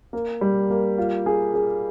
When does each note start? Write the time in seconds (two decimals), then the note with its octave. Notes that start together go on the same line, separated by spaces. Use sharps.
0.13 A#3
0.41 G3
0.70 A#3
0.98 F4
1.26 G#4
1.54 G#4